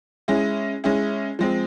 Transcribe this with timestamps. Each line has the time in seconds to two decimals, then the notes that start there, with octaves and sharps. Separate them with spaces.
0.28 G#3 C#4 E4 G#4
0.84 G#3 C#4 E4 G#4
1.39 F3 G#3 C4